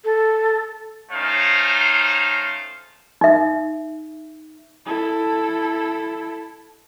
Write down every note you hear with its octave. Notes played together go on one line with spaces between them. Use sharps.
A4
A3 C#4 D#4 C5 F5
D#4 E5
E4 A4